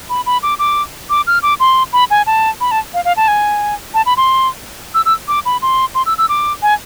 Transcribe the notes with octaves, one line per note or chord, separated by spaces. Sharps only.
B5
B5
D6
D6
D6
F6
D6
C6
B5
G#5
A5
B5
A5
F5
F5
A5
G#5
A5
B5
C6
E6
E6
D6
B5
C6
C6
E6
E6
D6
G#5